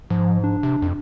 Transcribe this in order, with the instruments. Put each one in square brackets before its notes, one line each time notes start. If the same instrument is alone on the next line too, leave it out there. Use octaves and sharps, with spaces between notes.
[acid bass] G#2 [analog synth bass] F3
[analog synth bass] D4
[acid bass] C3
F2